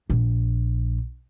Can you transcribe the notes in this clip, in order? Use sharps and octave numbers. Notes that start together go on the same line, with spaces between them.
A#1